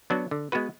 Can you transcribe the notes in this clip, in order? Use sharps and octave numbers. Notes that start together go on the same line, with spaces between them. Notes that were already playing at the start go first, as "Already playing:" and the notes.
F#3 B3 D4 F#4
D3
G#3 B3 F#4 B4